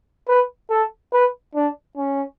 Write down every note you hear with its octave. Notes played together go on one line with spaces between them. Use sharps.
B4
A4
B4
D4
C#4